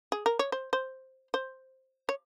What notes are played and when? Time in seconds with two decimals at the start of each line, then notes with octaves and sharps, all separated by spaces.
0.12 G#4
0.26 A#4
0.39 C#5
0.52 C5
0.73 C5
1.34 C5
2.09 C#5